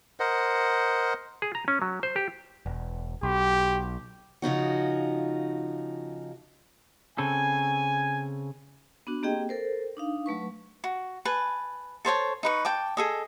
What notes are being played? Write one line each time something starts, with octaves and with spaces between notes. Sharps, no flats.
A#4 C5 D#5 F#5
G#4
A#5
C#4
F#3
C5
G4
E1
B1 G4
C#3 F3 D#4 F#4
C#3 C4 A4 G#5
B3 D4 F#4
A#3 C4 G4 G#4 D#5 G5
A4 A#4 C5
D4 D#4 F5
F#3 A3 B4 C#6
F#4
B4 G#5 A5
A4 C5 C#5 A5
D#4 B4 C#6
G5 A5 D6
G#4 A4 D#5